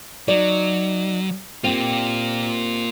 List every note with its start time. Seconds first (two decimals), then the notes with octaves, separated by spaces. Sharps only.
0.28 F#3 D#4 D5
1.64 A#3 C4 F4 G4